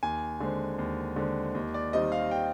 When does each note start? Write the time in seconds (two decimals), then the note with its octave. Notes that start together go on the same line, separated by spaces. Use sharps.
0.03 D#2 G#5
0.40 D3 G#3 C4
0.79 D#2
1.16 D3 G#3 C4
1.55 D#2
1.74 D5
1.93 D#3 G3 C4 D#5
2.12 F5
2.31 G5